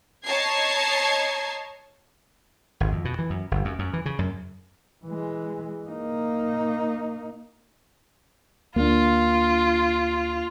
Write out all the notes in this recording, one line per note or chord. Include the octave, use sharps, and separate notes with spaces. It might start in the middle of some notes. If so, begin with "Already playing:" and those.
C#5 D#5 A5 A#5 G#6 C7
G#1
F2
B2
E3
F#2
G1
F#2
F#2
E3
C#3
F#2
E3 G#3
A#3 D#4
D2 A#3 D4 F4